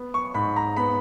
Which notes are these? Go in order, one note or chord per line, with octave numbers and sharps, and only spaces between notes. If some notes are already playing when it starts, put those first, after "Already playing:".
Already playing: B3
C#6
G#2 B5
A#5
B3 B5